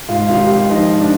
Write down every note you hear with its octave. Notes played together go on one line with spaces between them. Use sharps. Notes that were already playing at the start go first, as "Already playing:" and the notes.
G#2 F4
G#1 F4
G4
G#1
F3 D#4
G#2
D4